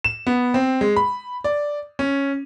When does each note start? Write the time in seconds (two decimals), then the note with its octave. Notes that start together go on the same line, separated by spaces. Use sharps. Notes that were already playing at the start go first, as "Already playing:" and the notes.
0.04 E7
0.27 B3
0.54 C4
0.81 G#3
0.96 B5
1.44 D5
1.99 C#4